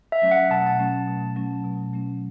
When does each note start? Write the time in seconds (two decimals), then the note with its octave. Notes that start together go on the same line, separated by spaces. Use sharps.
0.12 E5
0.22 F#3 A3 C#4
0.31 F#5
0.50 B2 A5
0.66 A5
0.79 F#3 A3 C#4
1.08 B2
1.36 F#3 A3 C#4
1.65 B2
1.93 F#3 A3 C#4